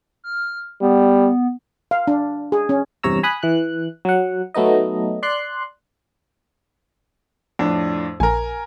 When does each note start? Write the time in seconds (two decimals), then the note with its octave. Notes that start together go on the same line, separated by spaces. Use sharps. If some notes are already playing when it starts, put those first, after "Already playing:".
0.24 F6
0.81 G3 B3
1.91 F5
2.07 D4
2.52 G#4
2.69 C#4
3.03 E2 G2 C3 C#5 A#5 E6
3.23 G#5 B5 D#6 F#6
3.43 E3 F#6
4.05 F#3 F#5
4.54 F#3 A3 B3 D#4 D#5
5.23 D5 C6 F#6
7.59 F2 A2 D4
8.20 A#1 A#4 G#5